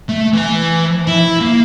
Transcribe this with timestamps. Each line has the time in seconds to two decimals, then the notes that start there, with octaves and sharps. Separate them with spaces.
0.09 A3
0.33 E3 G#5
1.07 E4
1.40 A#3